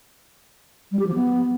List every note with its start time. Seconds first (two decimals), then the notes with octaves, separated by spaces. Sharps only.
0.92 G3
0.99 G4
1.07 F3
1.15 B3